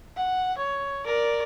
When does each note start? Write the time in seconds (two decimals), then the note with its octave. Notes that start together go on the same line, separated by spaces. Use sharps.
0.16 F#5
0.58 C#5
1.06 A#4 D5